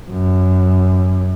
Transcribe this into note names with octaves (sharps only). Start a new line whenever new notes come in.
F#2